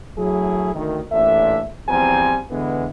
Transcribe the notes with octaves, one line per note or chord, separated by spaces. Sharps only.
F#3 A3 E4 G#4
D2 D#3
A1 A#2 D4 A4 E5
E2 F3 G3 C4 G#5 A#5
D3 E3 G#3 B3